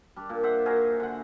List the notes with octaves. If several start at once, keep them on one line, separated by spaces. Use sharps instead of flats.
G3 D4
A#2
C5 E5 F#5
F#4 G#4 A#4 C5
D3 F#5